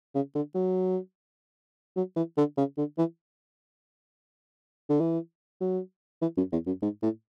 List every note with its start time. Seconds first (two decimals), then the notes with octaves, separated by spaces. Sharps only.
0.15 C#3
0.35 D3
0.55 F#3
1.96 F#3
2.16 E3
2.38 D3
2.57 C#3
2.77 D3
2.98 E3
4.90 D3
5.00 E3
5.61 F#3
6.22 E3
6.37 F#2
6.52 E2
6.67 F#2
6.82 G#2
7.02 A2